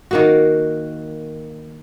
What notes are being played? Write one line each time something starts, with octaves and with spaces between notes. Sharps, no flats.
D#3 A#3 F#4